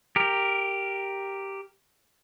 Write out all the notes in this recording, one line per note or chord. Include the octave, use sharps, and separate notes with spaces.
G4 A#4